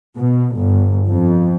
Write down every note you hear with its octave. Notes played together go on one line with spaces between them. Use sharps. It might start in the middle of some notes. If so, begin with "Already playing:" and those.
B2
G1
F2